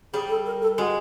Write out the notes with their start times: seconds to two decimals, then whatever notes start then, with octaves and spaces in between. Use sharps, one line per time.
0.13 G3 G#4
0.29 A4
0.46 A#4
0.62 A4
0.78 G#3 F#4